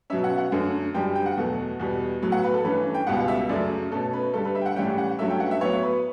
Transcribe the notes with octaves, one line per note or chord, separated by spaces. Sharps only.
B2 F#3 C#4 E5
F#5
F#5
F#2 D3 A3 C#4
F#2 D3 G3 G5
G5
F#5
E2 B2 F#3 A3
E2 B2 G3
A2 F#3 B3
F#5
B4
A4
G2 E3 A3 C#4 B4
G5
C#2 B2 G3 B3 F#5
E5
F#2 C#3 F#3 A3 D5
B2 A3 C#4 A4
B4
G2 D3 G3 A4
B4
E5
G5
F#5
A2 E3 G3 C#4 G5
F#5
G2 F#3 A3 C#4 E5
G5
F#5
E5
A2 F#3 B3 C#5
B4